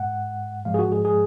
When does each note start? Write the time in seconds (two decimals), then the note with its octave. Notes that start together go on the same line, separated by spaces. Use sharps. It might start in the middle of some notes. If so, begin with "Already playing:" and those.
Already playing: G#2 G#3 F#5
0.65 G#2 F3 G#3 F5
0.74 G#4
0.79 F#4
0.92 G#4
1.05 G#4